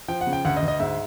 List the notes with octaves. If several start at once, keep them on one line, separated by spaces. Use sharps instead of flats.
F3 G5
F#5
C#3
G5
D2 F#5
D#5
D2
D#5
G#2 E5